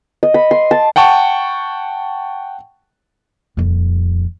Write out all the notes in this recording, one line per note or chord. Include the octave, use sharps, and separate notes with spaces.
D#5
B5
C6
A5
F#5 G5 A5 C#6
D#1 F2